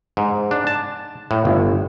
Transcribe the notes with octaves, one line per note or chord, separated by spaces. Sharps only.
G#2
D4
A5
A2
G1